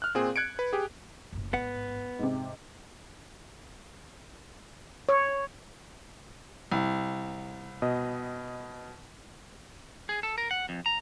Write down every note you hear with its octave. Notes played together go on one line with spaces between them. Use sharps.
F6 F#6
A#2 C4 G#4
F#6 G#6 C#7 D7
B4
G4 G#4
F#1 A2
A1 G#2 B3 F#5
F2 G#2 C3
C#5
C2
B2 D#5
G#4
A4
A#4
F#5
F2
A#5